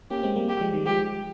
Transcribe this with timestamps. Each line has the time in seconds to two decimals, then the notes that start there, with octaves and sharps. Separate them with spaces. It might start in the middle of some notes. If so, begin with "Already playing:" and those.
0.10 A#3 C#4 G4
0.23 G#3 C4
0.36 G3 A#3
0.49 G4
0.61 F3 G#3
0.73 D#3 G3
0.86 F3 G#3 G4